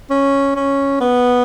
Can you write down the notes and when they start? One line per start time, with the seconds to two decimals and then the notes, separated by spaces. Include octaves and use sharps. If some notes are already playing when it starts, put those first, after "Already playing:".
0.10 C#4
0.55 C#4
1.00 B3